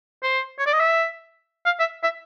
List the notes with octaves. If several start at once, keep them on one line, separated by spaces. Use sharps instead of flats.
C5
C#5
D5
D#5
E5
F5
E5
E5